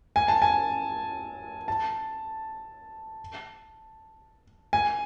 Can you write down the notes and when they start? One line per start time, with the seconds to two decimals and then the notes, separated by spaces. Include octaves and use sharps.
0.16 G#5
0.28 A5
0.42 G#5
1.68 A5
4.73 G#5